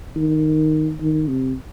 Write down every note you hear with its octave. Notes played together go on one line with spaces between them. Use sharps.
D#3
D#3
C3